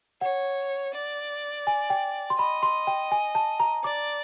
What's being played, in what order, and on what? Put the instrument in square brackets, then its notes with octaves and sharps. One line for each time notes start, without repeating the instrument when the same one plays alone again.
[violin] C#5 [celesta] F#5
[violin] D5
[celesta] G#5
G5
C6
[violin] D#5 [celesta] B5
[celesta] C6
G5
G#5
A5
A#5
[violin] D5 [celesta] D6